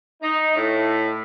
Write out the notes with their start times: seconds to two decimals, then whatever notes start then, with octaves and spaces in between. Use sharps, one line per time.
0.22 D#4
0.56 A2